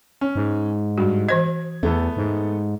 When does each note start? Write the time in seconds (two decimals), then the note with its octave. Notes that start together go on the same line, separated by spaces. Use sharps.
0.21 C#4
0.36 G#2
0.98 G2 F#4
1.29 E3 C5 D#5 G#6
1.83 E2 A3 B3 A4
2.17 G#2